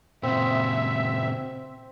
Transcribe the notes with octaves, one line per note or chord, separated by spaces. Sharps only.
A#2 C#3 C4 E5